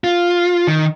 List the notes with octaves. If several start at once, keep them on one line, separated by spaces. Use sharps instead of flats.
F4
D#3